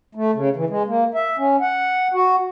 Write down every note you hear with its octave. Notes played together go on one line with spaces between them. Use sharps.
A3
C#3
E3
G#3
A#3
E5
C#4
F#5
F#4